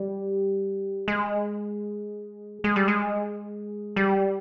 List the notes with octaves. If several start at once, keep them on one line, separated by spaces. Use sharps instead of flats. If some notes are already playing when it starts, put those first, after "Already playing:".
Already playing: G3
G#3
G#3
G3
G#3
G3